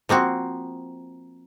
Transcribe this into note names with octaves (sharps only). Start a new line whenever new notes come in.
F3 A#3 C4 F#4